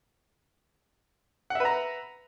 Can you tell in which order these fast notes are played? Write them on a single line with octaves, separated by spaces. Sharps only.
F#5 E5 B4 A#5